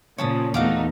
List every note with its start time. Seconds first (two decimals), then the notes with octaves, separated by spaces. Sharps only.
0.18 A#2 C#3 F3 C#5 A5 D#6
0.54 E2 A3 D#4 F#4 F5 D6